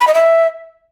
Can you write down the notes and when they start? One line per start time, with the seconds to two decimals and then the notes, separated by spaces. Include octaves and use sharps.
0.01 B5
0.07 D#5
0.14 E5